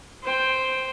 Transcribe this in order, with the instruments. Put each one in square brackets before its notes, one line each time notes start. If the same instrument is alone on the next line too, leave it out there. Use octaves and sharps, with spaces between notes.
[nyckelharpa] C5 G5